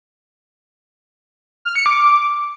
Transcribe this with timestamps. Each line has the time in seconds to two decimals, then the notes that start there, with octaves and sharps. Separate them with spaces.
1.65 F6
1.75 C#7
1.86 D6